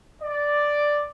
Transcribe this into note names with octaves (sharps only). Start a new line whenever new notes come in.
D5